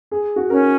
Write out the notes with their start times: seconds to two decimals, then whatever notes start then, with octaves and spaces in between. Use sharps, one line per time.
0.11 G#4
0.36 F#4
0.50 C#4 A#4